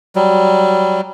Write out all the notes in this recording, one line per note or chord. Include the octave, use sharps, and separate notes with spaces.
F#3 G3